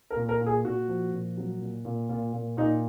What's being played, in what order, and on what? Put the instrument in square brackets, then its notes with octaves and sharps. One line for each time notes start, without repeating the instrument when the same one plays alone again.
[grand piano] A#4
A#2
A#4
A#2
G#4
A#2 F#4
F3
A#2
F#3
A#2
A#2
A#2 F4
A#2
A#2 D#4